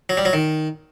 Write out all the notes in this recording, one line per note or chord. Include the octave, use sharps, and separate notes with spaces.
F#3
G3
F#3
D#3